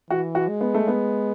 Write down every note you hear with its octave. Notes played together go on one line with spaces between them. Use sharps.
E3 F#4
F#4
G#3
B3
A3
B3